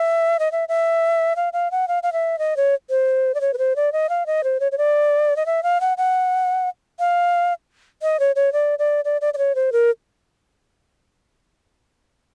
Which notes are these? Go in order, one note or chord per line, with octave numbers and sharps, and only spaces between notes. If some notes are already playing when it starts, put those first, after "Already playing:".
Already playing: E5
D#5
E5
E5
F5
F5
F#5
F5
F5
E5
D#5
C#5
C5
D5
C#5
B4
C5
D5
D#5
F5
D#5
C5
C#5
C#5
D5
D#5
E5
F5
F#5
F#5
F5
D#5
C#5
C#5
D5
D5
D5
D5
D5
C#5
C5
A#4